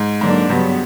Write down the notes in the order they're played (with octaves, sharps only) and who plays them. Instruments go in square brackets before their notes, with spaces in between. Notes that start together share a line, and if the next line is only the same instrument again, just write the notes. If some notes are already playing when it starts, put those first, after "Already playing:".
Already playing: [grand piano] G#2
[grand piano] G#2 [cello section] D3 F#3 A#3 D4
[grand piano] G2 [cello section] C#3 F#3 B3